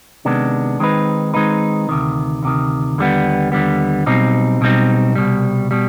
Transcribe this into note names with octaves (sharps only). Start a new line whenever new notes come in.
C3 D#3 G#3 B3 D4
D#3 G#3 C4 D#4 B4
D#3 G#3 C4 D#4 B4
D2 C3 D#3
D2 C3 D#3
D#2 D3 G3 B3
D#2 D3 G3 B3
B1 B2 G3 C4 D#4
B1 B2 G3 C4 D#4
C2 B2 G3
B2 G3